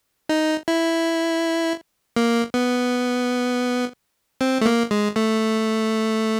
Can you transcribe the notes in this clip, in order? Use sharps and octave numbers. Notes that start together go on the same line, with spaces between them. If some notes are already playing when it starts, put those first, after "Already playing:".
D#4
E4
A#3
B3
C4
A3
A#3
G#3
A3